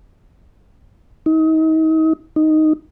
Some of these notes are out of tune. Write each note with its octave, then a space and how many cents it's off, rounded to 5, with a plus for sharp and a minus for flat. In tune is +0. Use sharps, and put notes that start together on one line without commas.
D#4 +35
D#4 +0